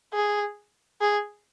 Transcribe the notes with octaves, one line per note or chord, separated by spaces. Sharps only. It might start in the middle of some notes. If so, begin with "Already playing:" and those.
G#4
G#4